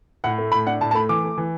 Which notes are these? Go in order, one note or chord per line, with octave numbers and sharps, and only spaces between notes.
A2 F#5
A3
A2 B5
D4 F#5
A2 A5
A5
A3 B5
E3 D6
A3
E3